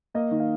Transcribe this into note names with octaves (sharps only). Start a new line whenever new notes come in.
A#3 D#5
D#3
F5